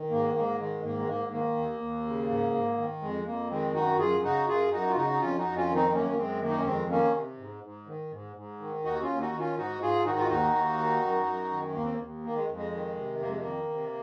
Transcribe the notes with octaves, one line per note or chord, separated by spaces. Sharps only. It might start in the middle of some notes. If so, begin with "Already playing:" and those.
Already playing: D#3
G#2 A#3
G#2 A#3
D#3 G#3
G#2 A#3
G#3
G#2 A#3
D#3 A#3
D#2
D#2
C#3
G#2
G#2
D#3
F2 G#3
F2 A#3
D#3 G#3 C4
F#2 D#4 F#4
F#2 F4 G#4
C#3 D#4 F#4
F#2 F4 G#4
F#2 D#4 F#4
F4
C#3 D#4 F#4
D#4
F2 C#4 F4
D#4 F#4
F2
C#4 F4
D#3
C4 D#4
C4
F#2 A#3 C#4
A#3
F#2 G#3 C4
D#3 A#3
D#4
C#4
F2 G#3 C4
D#3 A#3 C#4
C3
G#2
G#2
D#3
G#2
G#2
D#3
D#2 D#4 F#4
C#4 F4
D#2
D#4 F#4
D#3
C#4 F4
G#2 D#4 F#4
G#2 F4 G#4
D#3 D#4 F#4
F4
D#2 D#4 F#4
D#2
D#3
F#2
F#2
D#3
D#2 A#3
C4
A#3
D#2
D#3 A#3
G#3
F2
G#3
D#3
C3
F2 A#3
G#3
A#3
D#3
C3